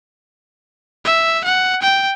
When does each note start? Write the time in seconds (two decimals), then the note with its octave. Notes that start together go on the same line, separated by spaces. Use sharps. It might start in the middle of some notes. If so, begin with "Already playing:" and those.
1.05 E5
1.45 F#5
1.82 G5